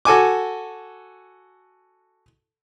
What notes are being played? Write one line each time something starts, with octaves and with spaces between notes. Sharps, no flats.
F#4 A4 G#5 D6